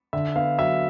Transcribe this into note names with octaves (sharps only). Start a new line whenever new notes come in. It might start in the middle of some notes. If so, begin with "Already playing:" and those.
D3 E5
B3 F5
F#3 E5